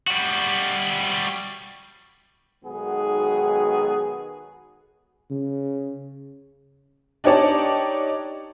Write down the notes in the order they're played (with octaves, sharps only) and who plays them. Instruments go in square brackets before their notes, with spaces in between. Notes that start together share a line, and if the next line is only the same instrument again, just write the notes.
[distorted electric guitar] G3 F#4
[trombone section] B1 D#3 G#3 B3 F#4 G#4
[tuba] C#3
[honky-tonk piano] D4 D#4 G4 C#5 D5 A5